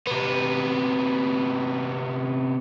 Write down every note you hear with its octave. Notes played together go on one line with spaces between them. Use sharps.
C3 B3